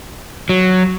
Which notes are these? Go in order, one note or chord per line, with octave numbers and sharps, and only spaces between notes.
F#3